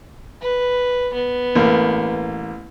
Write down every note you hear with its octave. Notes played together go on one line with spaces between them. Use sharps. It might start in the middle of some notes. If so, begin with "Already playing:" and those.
B4
B3
A1 A#3